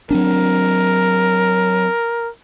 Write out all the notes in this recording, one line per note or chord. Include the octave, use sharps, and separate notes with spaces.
F#3 C4 D4 A#4